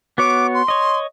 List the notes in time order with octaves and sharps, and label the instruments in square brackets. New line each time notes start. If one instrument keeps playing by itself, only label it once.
[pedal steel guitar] B3 F#4 C#5 [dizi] D6
[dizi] C6
[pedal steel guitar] C#5 D#5